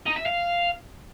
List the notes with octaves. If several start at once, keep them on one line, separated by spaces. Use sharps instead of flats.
D#4
E5
F5